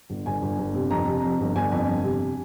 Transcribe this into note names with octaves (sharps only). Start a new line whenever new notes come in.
G1
G1 G#5
G1
G1
C3
F2 A#5
C3
F2 A#5
G1
G1 G#5
F2
G1
C3